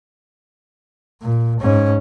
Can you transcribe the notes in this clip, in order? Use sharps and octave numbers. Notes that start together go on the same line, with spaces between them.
A#2
G#2 C#4